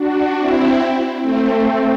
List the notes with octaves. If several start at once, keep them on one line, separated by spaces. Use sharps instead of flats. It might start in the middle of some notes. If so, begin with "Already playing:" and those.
Already playing: D4 F#4
C4 E4
A3 C4